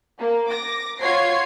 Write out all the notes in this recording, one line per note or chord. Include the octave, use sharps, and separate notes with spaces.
A#3
D6 A#6
F4 F#4 C#5 G#6 C7